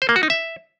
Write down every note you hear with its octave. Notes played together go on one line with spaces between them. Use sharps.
C5
A#3
F#4
D#4
E5